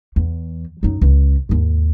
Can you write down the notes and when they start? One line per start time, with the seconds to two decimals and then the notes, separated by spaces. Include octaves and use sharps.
0.16 E2
0.83 F#2 D#4
1.01 C#2
1.49 D#2 G#2